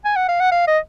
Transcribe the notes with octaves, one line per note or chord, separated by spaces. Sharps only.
G#5
F#5
F5
F#5
F5
D#5